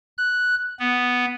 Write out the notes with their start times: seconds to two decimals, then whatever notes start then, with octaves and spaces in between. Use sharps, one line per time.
0.18 F#6
0.79 B3